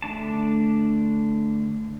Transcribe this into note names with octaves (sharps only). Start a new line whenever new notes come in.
D3 A3 D4 A5